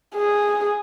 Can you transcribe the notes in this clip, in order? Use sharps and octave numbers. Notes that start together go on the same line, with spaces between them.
G#4